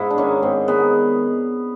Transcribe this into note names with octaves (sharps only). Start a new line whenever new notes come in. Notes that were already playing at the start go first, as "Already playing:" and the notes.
Already playing: G#2 E4
D4
D#3 G#3 C#4
G#2 C4
D#3 G#3 B3